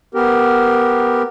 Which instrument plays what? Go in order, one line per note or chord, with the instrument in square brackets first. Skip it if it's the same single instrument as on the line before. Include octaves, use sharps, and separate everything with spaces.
[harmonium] B3 G4 A#4